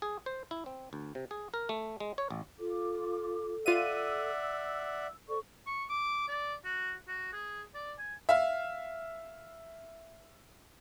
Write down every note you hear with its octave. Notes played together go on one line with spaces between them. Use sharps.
G#4
C5
E4
C4
D2
C3
G#4
A#4
A3
G#3
C#5
A1
F4 A4 D6
F4 D5 E5 F#5 E6 D#7
A4 C5 D5 C#6
C#6
D6
D5
F#4
F#4
G#4
D5
G#5
E5 F5